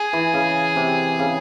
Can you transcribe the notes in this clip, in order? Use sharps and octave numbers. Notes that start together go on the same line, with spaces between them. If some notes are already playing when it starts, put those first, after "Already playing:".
Already playing: G#4
E3
C#3
C3
C#3